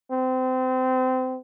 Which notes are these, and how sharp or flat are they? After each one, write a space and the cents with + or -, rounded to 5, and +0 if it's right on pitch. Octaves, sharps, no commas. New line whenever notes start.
C4 -25